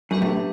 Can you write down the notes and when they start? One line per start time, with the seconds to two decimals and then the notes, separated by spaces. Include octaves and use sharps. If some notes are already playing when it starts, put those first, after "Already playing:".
0.10 F#2 B3 D4 G4 B4 E5
0.22 A2